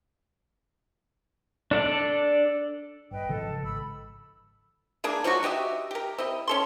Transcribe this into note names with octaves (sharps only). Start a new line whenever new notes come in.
D4 A4 D5
G1 B4 D#5 G5
G#1 C#3 F3 A4
G#1 B5 E6
G#3 A#3 D4 G#4
F3 F#3 G#3 F#4
F#4 G4 D#5 E5
G4 A#4
C4 E4 D#5
C#4 A4 C6